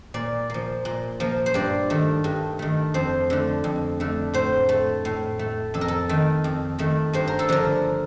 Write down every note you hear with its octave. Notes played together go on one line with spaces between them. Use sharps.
A#2 D5
F3 A#3
A#2
F3 A#3
C5
G2 D5
D#3 A3
G2
D#3 A3
F2 C5
D3 A3
F2
D3 A3
A2 C5
A3
A2
A3
F2 A4
A#4
A4
D#3 A3
F2
D#3 A3
G2 C5
A#4
A4
D3 F3 A#4